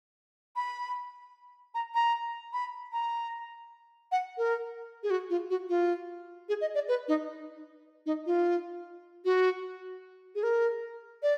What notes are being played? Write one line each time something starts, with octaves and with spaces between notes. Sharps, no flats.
B5
A#5
A#5
B5
A#5
F#5
A#4
G#4
F#4
F4
F#4
F4
G#4
D#5
D5
B4
D#4
D#4
F4
F#4
G#4
A#4
D5